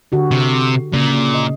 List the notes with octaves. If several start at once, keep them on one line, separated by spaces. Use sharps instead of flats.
D3 F#4 G4
C3
A#2 C#3
D#5